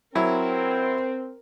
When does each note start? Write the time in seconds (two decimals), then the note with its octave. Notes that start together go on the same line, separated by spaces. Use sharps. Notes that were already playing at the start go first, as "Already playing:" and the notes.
0.15 F#3 C4 E4 A#4